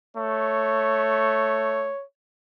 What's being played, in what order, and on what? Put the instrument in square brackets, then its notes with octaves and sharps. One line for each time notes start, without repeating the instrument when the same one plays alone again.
[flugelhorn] A3 [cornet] C#5